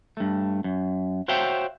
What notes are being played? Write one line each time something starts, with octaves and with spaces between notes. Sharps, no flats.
G2 A3
F#2
F#4 C5 C#5 E5 F5 G5